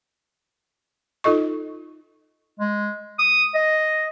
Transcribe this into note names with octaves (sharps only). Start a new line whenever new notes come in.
D#4 F4 A4 D#5 C#6
G#3
D#6
D#5